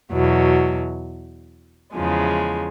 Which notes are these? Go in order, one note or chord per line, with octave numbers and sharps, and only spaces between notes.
E2 B2 F#3
E2 C#3 F3 G#3